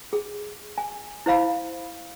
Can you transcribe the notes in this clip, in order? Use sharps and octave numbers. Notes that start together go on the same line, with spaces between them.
G#4
G#5
E4 C5 F5 B5